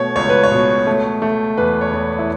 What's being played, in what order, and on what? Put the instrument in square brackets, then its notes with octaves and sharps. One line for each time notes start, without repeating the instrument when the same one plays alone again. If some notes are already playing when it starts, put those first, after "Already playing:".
Already playing: [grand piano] B2 A3 C#5
C#2 C#5
B4
C#5
B2
A3
A3
E2 B4
C#5
E2
E4